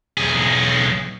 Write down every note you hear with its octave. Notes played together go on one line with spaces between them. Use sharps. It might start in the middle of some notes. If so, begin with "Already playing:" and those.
B1 G#4